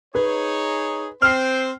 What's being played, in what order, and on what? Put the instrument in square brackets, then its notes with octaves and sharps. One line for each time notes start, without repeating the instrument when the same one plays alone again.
[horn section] D#4 G#4 C#5 [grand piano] B4
[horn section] C4 C5 [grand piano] F6 C7